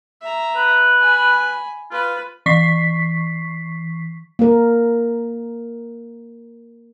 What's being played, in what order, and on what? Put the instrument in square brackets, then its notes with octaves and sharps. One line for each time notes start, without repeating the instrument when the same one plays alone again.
[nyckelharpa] E5 A#5
[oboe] B4
[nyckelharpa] G#5 B5
[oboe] F4 [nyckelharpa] B4
[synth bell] E3 C#6 B6 C7
[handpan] A#3 A#4